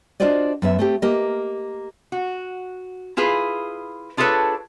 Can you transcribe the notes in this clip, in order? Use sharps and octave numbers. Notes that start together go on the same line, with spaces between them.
D4 F4 F#4 C5 D5 D#5
F#2 B3 E5
A3 C4 G4
A#3 G4 A#4 D#5
F#4
E4 F4 G#4 B4
D4 F4 G#4 A4 B4 C#5